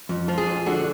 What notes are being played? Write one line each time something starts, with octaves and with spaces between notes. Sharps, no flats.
F2
F3
G#4
F2
D3 F#4